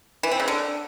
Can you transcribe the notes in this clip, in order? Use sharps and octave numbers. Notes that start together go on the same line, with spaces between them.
E3
C4
C#3
D3